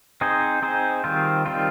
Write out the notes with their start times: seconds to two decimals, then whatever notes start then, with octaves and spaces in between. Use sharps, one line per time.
0.21 C4 D#4 G#4 C5
0.62 C4 D#4 G#4 C5
1.04 D#3 G3 C4 F4
1.46 D#3 G3 C4 F4